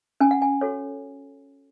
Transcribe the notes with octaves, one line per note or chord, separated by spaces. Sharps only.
C#4 G#5
F#5
G#5
F#4 A4 C#5